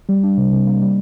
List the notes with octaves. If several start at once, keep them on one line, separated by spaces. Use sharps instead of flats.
G3
D4
C3
C3
A#3
G3